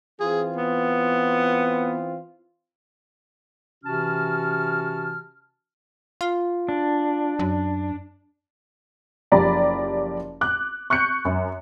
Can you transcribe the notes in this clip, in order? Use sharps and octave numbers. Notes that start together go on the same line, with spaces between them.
E3 C4 F4 G#4
B3
C3 E3 C#4 F#4 A5 F6
F4
D4
F#2
F#1 F3 G4 D5 A#5 B5
D6 F#6
C#6 F#6 G6 C#7
F#2